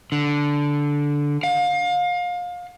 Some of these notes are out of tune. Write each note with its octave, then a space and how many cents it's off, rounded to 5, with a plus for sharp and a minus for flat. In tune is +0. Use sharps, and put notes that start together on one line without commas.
D3 -10
F5 +30